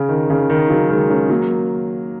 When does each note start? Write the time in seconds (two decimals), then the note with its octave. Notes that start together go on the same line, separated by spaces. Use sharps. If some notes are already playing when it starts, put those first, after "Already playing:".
Already playing: C#3
0.09 D#3
0.30 C#3
0.50 D#3
0.70 C#3 F#3
0.90 D#3 G#3
1.10 G#3 C#4
1.29 F#3 A#3